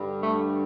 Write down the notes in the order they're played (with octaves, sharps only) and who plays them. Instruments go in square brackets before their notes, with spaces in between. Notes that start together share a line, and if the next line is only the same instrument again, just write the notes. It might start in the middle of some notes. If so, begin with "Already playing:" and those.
Already playing: [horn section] G2 D3 G3
A3